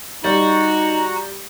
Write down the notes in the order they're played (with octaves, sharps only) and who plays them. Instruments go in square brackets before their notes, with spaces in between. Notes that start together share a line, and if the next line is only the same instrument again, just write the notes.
[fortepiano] G3 [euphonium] D#4 [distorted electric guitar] F#4 [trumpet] A#5